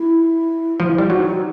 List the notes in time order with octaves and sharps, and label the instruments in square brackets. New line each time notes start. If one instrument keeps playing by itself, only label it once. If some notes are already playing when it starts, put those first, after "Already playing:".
Already playing: [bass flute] E4
[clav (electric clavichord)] F3 [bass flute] E4
[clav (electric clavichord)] G3
[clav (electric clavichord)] F#3 [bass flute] D#4